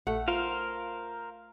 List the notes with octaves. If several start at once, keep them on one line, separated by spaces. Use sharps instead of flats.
A#1 A3 F#5
F4 A#4 C5 F5